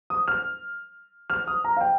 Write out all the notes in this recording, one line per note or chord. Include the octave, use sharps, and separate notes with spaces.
D#6
F6
F6
D#6
A#5
F5
G5